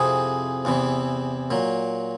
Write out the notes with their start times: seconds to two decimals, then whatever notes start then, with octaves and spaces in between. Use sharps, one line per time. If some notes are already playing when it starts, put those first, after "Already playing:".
Already playing: F2 C3 E3 G#4
0.65 E2 C3 E3
1.51 A#2 F#3